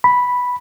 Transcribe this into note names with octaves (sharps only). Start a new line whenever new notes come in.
B5